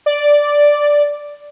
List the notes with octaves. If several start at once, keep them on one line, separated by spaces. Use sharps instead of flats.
D5